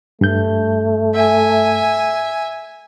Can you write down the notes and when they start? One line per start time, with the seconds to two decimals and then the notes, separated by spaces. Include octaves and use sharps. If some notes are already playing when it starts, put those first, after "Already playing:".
0.21 G2 A3 G6
1.15 E5 G#5